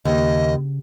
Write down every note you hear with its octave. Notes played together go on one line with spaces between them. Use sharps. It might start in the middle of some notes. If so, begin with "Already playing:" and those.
D#2 C#3 D#5